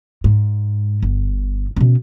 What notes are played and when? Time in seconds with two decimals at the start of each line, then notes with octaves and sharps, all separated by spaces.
0.24 G#2
1.02 G1
1.76 B2 C#4